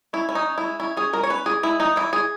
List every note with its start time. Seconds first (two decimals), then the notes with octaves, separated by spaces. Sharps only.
0.13 C#4 E4
0.29 C#4 E4
0.35 D#4
0.46 C#4
0.58 E4
0.63 G#3
0.80 C#4 E4
0.97 C#4 G#4
1.13 G#3 A#4
1.23 C#5
1.30 C#4 B4
1.46 E3 G#4
1.63 G#3 E4
1.80 E3 D#4
1.96 E3 E4
2.13 E3 G#4